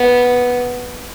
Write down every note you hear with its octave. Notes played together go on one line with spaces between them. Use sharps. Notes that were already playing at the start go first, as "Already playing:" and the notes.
Already playing: B3